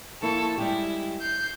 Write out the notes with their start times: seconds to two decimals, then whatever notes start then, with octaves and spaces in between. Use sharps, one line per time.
0.22 F3 A#3 E4 A4 C#6
0.58 G3 G#3 E4 G4
1.21 G6 C7